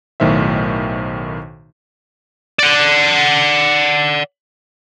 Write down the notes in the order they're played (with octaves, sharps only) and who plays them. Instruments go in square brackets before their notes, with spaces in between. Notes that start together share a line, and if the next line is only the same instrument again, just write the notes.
[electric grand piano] B1 A2 D#3 C5 E5
[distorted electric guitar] D5 F#5